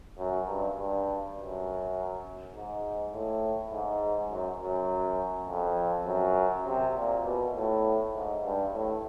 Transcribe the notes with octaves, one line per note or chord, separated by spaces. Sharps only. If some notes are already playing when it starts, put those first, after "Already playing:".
F#2
G2
G2
F#2
G#2
A2
G#2
F#2
F#2
F2
F#2
C3
A#2
B2
A2
G#2
G2
A2